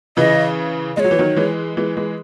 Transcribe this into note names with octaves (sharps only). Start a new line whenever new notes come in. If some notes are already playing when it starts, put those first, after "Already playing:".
C#3 E3 D#5
G#3 D#5
F#3 C#5
E3
D#3 F#3
E3 G#3
E3 G#3
E3 G#3